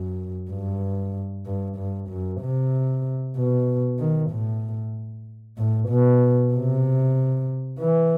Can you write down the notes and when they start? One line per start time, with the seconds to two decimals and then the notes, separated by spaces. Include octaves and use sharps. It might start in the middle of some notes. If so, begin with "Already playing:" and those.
Already playing: F#2
0.50 G2
1.46 G2
1.78 G2
2.10 F#2
2.41 C3
3.36 B2
3.99 D#3
4.31 A2
5.57 A2
5.89 B2
6.52 C3
7.79 E3